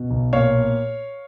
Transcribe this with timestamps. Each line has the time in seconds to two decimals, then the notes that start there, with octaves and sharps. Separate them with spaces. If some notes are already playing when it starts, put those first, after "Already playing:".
Already playing: B2
0.11 B1
0.33 A#2 C#5 F5